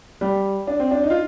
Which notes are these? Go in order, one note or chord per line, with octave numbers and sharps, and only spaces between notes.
G3
D4
C4
D4
D#4
F4